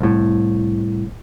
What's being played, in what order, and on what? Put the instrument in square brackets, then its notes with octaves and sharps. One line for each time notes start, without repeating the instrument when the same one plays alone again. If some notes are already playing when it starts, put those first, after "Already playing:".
[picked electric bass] C2 A2